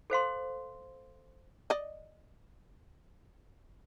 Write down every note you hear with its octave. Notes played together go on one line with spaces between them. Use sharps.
A4 C5 F5 C6
D5 D#5